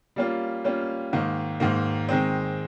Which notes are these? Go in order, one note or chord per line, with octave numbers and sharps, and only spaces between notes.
G3 A#3 C#4 F4
G3 A#3 C#4 F4
G#2 D#3 A#3
G#2 D#3 A#3
D#3 G#3 C4